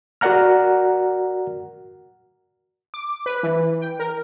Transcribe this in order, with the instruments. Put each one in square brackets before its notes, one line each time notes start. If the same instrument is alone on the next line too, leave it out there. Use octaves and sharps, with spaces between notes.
[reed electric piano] F#4 A#4 D5 F#5 A#5 F6
[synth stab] D6
B4
E3
G5
A#4